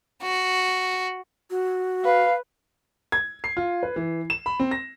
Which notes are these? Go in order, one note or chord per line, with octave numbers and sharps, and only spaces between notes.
F#4
F#4
B4 F5
G#6
C7
F4
B4
E3
E7
B5
C4
A#6